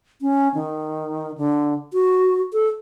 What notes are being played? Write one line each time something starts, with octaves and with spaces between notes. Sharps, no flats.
C#4
D#3
D3
F#4
A4